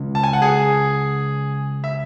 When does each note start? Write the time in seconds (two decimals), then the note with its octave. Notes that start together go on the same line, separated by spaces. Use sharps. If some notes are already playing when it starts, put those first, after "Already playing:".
Already playing: C#3 G#3 C#4
0.15 A5
0.24 G#5
0.33 F#5
0.42 G#4 G#5
1.84 E5